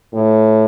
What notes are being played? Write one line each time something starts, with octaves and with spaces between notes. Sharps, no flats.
A2